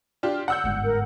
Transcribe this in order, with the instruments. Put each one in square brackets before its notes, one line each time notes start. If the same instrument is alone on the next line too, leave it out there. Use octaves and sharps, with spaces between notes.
[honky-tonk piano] D4 F4 G4
F#5 E6 G6
[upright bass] G1 G#2
[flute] A#4